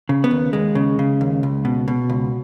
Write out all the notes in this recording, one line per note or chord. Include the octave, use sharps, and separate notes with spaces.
C#3
B3
D#2
D#2 G#3
C#3
C#3
D#2
C#2
B2
B2
C#2